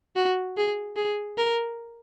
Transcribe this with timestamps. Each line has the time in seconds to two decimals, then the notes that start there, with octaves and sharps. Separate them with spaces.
0.16 F#4
0.57 G#4
0.96 G#4
1.38 A#4